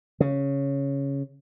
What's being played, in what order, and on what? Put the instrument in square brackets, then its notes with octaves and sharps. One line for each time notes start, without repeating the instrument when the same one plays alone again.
[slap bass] C#3